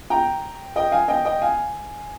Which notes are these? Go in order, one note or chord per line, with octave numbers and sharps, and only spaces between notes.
G5 A#5
D#5 G5
F5 G#5
D#5 G5
D#5 G5
F5 G#5